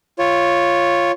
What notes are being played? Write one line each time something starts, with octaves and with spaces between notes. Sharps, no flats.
F4 C#5